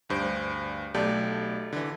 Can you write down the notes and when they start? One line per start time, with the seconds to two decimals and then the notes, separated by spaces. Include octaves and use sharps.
0.09 D2 G2 C5 G6 D7
0.94 B1 A3 G4 D5 A5 G6
1.73 D3 E3